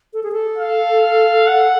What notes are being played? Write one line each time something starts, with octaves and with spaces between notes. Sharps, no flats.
A4
G#4
A4
F5
F#5